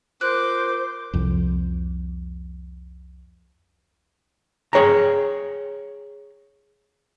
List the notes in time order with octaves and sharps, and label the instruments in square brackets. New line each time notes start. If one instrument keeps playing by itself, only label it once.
[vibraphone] F4 A#4 [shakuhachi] C5 [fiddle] D6 [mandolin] F#6
[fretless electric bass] C2 F2
[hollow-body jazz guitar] G#4 C#5 G5 A#5